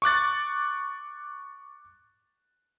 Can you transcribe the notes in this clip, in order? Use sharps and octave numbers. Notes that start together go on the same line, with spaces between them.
C#6 D6 F#6 A6